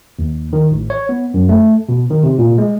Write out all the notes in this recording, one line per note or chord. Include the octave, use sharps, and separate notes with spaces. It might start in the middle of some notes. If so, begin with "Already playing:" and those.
D#2
D#3
A1
C#5
B3
F#2
A3
B2
D#3
C3
A#2
G#3